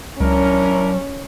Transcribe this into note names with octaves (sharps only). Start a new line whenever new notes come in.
C#2 F#3 C#4 D4 E4 A#4